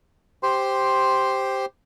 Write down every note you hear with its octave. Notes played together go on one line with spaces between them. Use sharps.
G4 C5 C6